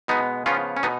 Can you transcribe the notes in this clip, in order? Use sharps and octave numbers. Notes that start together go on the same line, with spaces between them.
B2 G#3 B3 D#4
C#3 F3 B3 C#4 F4
C#4
B2 B3 D#4